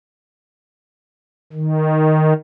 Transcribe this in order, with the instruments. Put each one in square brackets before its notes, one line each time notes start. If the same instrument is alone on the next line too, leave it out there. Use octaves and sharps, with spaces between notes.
[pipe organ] D#3